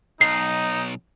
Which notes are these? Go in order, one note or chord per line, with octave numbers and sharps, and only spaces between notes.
B1 D#4 C7